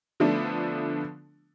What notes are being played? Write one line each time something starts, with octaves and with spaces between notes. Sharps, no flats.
D3 F3 A3 B3 D4 A4